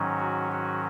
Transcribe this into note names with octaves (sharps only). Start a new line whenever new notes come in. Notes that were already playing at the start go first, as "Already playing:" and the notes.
Already playing: G#2 D#3 F#3 C#4
F#4
F#4